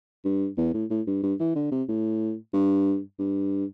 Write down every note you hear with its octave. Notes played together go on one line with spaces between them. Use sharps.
G2
E2
A2
A2
G2
G2
E3
D3
C3
A2
G2
G2